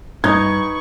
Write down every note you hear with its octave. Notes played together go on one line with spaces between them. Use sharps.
G2 D#4 B4 C#6 G#6